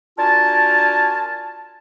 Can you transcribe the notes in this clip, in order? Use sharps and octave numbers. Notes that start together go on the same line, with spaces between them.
D4 F4 F#4 A#4 G#5 A5